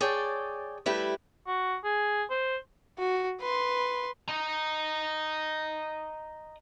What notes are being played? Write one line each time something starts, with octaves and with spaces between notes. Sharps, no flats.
G#4 C#5 D5 G5 A5
G3 A3 E4 G4 B4
F#4
G#4
C5
F#4
B4 C6
D#5 A#5